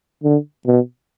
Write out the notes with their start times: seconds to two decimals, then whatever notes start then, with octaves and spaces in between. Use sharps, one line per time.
0.23 D3
0.66 B2